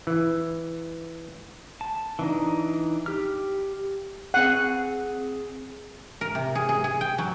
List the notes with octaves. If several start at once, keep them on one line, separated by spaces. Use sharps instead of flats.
E3
A5
E3 D4 D#4
G4 F6
C4 G#4 F#5
A#4
C3
G#4
G#4
G#4
G5
F#3